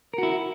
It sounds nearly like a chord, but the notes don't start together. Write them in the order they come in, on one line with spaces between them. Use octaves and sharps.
A#4 F#4 E4